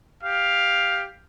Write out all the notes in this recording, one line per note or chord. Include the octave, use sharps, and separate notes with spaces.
G4 F5